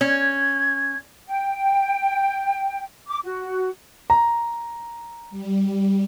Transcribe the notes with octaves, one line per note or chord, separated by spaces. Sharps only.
C#4 G#6
G5
D6
F#4
A#5
G3